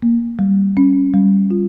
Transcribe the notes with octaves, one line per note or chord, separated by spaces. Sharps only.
A#3
G3
C#4
G3
F4